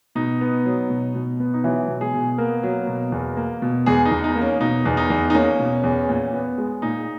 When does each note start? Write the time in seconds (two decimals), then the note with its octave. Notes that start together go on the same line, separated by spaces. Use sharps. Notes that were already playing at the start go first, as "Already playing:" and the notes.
0.15 B2 D#4
0.41 B3
0.65 F#3
0.90 B2
1.15 B2
1.40 B3
1.54 D#4
1.63 E3 F#3 E4
1.88 B2
2.01 G#3 G#4
2.14 B2
2.38 A#3 B3 A#4
2.63 F#3
2.87 B2
3.12 E2
3.37 A#3
3.62 B2
3.86 E2 G#3 G#4
4.05 D#4
4.11 E2
4.24 D#4
4.35 A#3
4.41 C#4
4.60 B2 D#4
4.85 E2
4.97 D#4
5.10 E2
5.30 D#4
5.34 A#3 C#4
5.59 B2
5.84 E2
6.09 A#2
6.34 B3
6.58 G#3
6.82 A#2 D#4